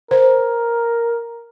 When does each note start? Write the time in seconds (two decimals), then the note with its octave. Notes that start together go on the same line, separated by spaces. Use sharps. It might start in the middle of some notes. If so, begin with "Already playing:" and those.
0.11 A#4 C5